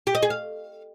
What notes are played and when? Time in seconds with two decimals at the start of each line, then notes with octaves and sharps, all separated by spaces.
0.07 G4
0.15 D#5
0.22 G#4
0.30 F5